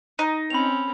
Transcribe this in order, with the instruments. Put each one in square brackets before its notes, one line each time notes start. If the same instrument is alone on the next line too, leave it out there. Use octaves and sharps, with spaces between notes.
[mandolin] D#4
[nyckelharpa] C4 C#4 [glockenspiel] B5 F7